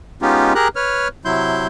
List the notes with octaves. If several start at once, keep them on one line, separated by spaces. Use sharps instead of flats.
G#3 B3 C#4 D#4 F4 G4
G4 G#4 A#4 A#5 F#6
B4 C#5 F6
C3 F#3 E4 C6 G6